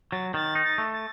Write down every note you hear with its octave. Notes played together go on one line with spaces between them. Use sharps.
F#3 A6
D#3 A6
D#4
A6
A3
A6